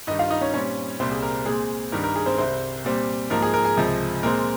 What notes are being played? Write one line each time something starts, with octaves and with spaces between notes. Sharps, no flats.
G2 D#3 G3 D#4 D#5
F4 F5
D#4 D#5
C#4 C#5
A#2 G3 C4 C#4 C#5
C2 A#2 G3 C4 C5
G#4
A#4
A#2 G#3 C4 G#4
G2 D#3 G3 A#4
A#4
G#4
C4 C5
C2 C3 G3 C4 C5
A#2 G3 C4
G#2 F3 A#3 A#4
G#4
A#4
G#4
C#2 C3 F3
A#2 G#3 C4 A#4